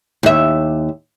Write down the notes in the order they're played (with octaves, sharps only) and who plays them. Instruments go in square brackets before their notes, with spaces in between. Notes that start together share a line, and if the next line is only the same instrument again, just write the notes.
[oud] D#2 E5